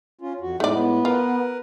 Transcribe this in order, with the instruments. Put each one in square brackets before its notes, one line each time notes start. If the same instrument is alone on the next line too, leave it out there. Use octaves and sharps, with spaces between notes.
[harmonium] C#4 F4
F2 F#4
[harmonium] A2 G#3 [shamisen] A3 D5 [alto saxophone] D#4
[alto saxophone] B3
[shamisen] F4 [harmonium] A#4 B4